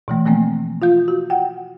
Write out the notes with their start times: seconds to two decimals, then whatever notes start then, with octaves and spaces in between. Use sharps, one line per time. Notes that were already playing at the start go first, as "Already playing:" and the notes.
0.08 B2 E3 A3
0.26 F3 A3 A#3 C4
0.82 F4 F5 G6
1.08 F#4
1.30 F#5 G5